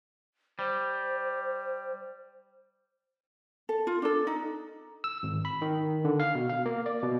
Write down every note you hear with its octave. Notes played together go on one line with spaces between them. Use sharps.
G3 C5
A4
F4
D4 A4
D#4
E6
G#1
B5
D#3
D3
F5
B2
F5
A#3
D5
B2